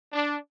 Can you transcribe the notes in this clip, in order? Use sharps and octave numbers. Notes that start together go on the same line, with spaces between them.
D4